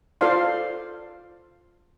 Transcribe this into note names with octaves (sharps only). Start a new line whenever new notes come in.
F4 A4 C5 D5 F5 C6